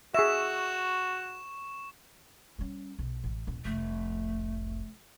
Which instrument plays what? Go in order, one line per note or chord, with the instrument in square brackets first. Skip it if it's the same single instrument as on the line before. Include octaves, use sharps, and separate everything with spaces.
[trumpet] F#4 [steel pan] G#4 E5 [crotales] C#6 E7
[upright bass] G3 C#4
B1
A1
D#1 E4
[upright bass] F1 C2 [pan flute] A3